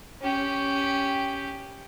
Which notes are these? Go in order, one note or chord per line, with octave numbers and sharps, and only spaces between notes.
C#4 G4